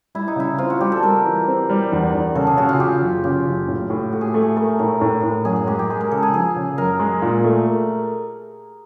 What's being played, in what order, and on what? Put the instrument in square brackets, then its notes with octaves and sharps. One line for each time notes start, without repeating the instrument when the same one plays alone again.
[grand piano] G3 [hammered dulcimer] E4
[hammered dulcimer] D#4
[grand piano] C#3 [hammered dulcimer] E4
[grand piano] C4 [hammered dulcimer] F4
[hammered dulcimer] F#4
[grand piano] G3 [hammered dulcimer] G4
[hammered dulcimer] A4
[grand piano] G3 [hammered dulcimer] A#4
[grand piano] E3
C4
G3
E2
E2
[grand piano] C#3 [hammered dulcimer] A4
[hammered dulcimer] G#4
[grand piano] C#3 [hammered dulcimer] F#4
[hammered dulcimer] F4
[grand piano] C#3 [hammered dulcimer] G4
[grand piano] F#1
[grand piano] C#3 [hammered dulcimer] G4
[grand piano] F#1
A2
A2
[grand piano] A3 [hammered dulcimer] F#4
[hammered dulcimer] G#4
G4
[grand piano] A3
[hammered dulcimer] G#4
[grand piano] A3 [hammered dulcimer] A#4
[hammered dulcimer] A4
[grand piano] A2 [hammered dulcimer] A#4
[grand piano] A2
A2
[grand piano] F#2 [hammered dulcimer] G#4
[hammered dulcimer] G#4
[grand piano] G#3 [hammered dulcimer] G4
[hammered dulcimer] G4
[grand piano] G#3 [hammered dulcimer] G#4
[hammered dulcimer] A#4
[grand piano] C#3 [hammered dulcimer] A4
[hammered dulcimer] G#4
[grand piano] F3 [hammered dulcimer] G#4
[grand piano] C#3
[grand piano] F#2 [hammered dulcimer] A#4
[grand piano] G#3
A#2
A3